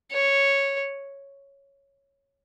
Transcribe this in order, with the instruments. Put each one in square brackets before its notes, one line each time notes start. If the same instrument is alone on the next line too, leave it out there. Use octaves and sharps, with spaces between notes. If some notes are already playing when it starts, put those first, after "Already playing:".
[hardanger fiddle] C#5